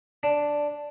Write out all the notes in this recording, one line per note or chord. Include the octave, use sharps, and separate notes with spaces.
D4